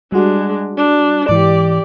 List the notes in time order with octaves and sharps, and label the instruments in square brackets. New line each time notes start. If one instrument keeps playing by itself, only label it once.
[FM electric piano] G3 F#4 [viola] G#3 D4
[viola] D4
[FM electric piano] G#2 E3 [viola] G4 D5